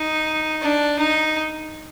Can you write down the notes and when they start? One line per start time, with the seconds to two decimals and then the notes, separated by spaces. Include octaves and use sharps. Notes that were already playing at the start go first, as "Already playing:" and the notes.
Already playing: D#4
0.62 D4
0.99 D#4